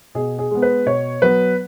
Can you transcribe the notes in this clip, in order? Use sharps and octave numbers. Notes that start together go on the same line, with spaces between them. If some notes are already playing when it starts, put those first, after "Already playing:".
B2 G#4
G#4
G#3 B3
B4
B2 C#5
F#3 B3 B4